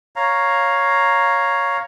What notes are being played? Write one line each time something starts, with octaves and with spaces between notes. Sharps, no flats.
C#5 F5 A#5